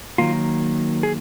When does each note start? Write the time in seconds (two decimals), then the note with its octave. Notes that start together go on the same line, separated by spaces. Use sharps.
0.18 D#3 F#3 A#3 F4
1.03 G#4